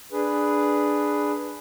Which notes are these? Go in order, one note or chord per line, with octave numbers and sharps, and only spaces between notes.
D4 G#4 B4